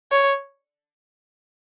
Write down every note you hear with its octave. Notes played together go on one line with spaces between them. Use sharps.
C#5